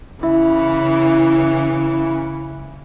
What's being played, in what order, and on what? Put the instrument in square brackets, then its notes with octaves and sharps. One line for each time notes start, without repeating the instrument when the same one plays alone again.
[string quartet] C#3 E3 [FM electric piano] E4 [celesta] E5